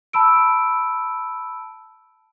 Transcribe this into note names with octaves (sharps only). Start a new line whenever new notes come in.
A5 B5 E6 D7